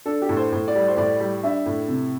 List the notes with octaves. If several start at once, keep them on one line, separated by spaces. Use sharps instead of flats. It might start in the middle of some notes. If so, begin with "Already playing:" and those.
D4 A4
G4
A2 A4
C5
A2
D5
G3
C5
A2 D5
G3
D4 E5
A2
C3